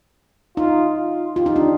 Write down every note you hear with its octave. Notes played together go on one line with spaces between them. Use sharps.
D#4 F4
F4
F4 G4
D#4
D4